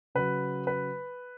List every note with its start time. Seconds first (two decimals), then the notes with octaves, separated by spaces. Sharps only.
0.15 C#3 F#3 B4
0.67 B4